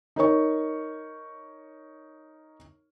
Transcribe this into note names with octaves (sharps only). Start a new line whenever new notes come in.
D#4 A#4 C#5 C#6